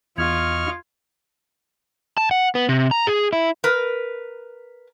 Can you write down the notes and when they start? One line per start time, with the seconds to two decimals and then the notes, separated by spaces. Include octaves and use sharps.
0.18 E2 F4 D#5 C#6 F6 G#6
2.18 A5
2.31 F#5
2.55 B3
2.69 C3
2.91 A#5
3.07 G#4
3.33 E4
3.64 A#4 B4